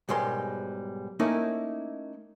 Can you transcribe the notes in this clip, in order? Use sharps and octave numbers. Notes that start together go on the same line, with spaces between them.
B1 G#2 G3 G#3 A#4 C6
A3 A#3 C#4 D#4 E4 A#4